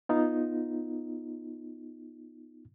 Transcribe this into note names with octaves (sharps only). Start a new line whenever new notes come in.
B3 D#4 F4